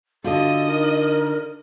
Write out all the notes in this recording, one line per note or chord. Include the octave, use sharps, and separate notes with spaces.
D3 F4 F#4 A4 D#5 F5
D#4 A#4